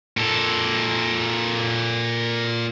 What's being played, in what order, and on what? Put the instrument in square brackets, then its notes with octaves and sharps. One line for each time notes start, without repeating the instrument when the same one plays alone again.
[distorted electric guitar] A#2 A4